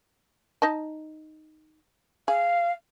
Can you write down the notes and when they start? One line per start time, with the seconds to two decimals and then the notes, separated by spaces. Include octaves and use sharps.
0.62 D#4 D#5 A5
2.28 G#4 F5